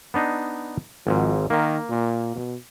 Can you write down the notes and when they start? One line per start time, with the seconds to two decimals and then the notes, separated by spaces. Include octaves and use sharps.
0.14 B3 D4 D#4
1.07 G#1 G#2 F3
1.50 D#3 A#3
1.89 A#2
2.36 B2